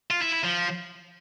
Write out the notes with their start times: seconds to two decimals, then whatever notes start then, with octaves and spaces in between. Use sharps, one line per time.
0.11 F4
0.22 E4
0.33 E4
0.45 F3